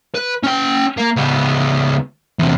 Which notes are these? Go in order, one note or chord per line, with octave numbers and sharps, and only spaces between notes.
B4
C#4 G5
A#3
C#2 B3
E2 C3